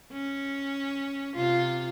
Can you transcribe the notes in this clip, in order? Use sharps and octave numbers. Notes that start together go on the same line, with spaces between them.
C#4
C3 F4